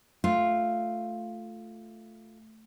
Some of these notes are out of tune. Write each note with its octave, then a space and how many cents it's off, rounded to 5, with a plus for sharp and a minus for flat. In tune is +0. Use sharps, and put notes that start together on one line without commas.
A3 +0 F4 +0